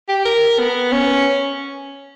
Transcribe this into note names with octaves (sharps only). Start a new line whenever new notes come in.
G4
A#4
B3
C#4